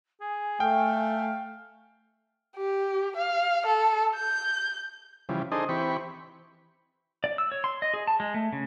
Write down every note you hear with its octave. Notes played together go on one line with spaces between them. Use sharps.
G#4 G#5
A3 F5 G5
G4
F5
A4
G6
C#3 E3 F3 G3
D4 D#4 G#4 A4 C5 D#5
E3 C4 G4 B5 C#6
D5
E6
C#5
C6
D#5
G#4
A5
G#3
A3
C#3